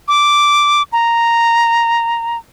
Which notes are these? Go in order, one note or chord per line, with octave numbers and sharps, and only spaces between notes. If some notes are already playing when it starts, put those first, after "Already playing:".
D6
A#5